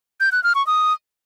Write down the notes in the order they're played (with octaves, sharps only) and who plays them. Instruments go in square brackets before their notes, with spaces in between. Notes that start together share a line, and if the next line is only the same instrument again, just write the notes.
[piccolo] G6
F#6
F6
C#6
D#6